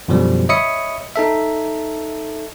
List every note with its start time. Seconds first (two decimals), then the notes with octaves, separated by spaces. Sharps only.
0.08 F#2 B2 D3 F3 G3
0.49 C#5 D#5 E5 B5 D#6 C#7
1.16 D#4 A4 E5